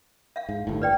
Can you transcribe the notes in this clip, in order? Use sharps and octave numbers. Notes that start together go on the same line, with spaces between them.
E5 F5
G#2
G1 A2
B4 D5 G5